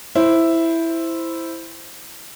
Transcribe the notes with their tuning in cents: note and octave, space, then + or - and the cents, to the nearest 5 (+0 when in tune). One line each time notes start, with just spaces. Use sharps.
E4 +0 C5 +0